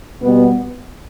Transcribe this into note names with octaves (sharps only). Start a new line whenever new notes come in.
B2 G3 B3